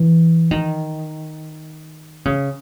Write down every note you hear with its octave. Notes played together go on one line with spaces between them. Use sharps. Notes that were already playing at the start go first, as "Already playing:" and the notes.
Already playing: E3
D#3
C#3